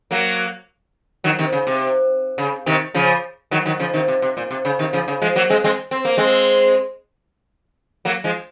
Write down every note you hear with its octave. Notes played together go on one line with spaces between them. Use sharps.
F#3 A#3
D#3 F#3
C3 D#3
C#3
C3
C#3
C3 D#3
C#3 F3
D#3 F#3
D#3 F#3
C#3 F3
C3 D#3
C3
C3
A#2
C3
C#3
C3 D#3
C#3 F3
C#3
F3 G#3
F#3 A#3
G#3 C4
G#3 C4
C4
A#3
G#3 C4
F#3 A#3
F3 G#3